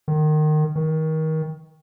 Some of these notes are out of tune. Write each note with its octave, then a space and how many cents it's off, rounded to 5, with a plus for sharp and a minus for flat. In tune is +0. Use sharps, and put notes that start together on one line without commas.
D#3 -25
D#3 +25